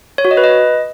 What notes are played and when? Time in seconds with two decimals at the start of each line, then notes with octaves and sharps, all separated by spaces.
0.18 C#5
0.25 F#4
0.31 D#5
0.37 B4
0.44 D#5